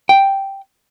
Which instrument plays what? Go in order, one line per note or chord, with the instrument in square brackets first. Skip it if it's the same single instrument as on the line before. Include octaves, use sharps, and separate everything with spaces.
[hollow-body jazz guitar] G5